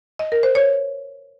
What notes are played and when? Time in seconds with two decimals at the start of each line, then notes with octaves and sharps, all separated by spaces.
0.19 D#5
0.32 A#4
0.43 C5
0.55 C#5